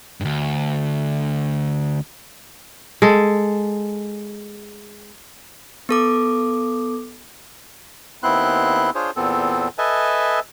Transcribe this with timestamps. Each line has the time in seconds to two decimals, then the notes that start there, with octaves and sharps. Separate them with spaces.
0.21 D2 G2
3.02 G#3 A4
5.89 B3 A4 D6
8.23 D#2 B3 C4 E4 C6 F#6
8.95 D4 F4 G#4 C5 C#5
9.16 E2 A#2 B3 C4 A4
9.78 A4 B4 D#5 E5 G#5 A5